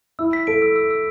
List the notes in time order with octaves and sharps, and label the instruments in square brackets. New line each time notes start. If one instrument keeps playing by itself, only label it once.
[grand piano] E4 [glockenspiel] E6
[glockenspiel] B6
[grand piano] A4 [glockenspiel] D7
[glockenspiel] E6
E6
E6